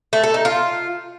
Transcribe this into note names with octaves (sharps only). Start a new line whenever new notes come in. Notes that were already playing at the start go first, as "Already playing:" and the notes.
A3
A4
D#4
F4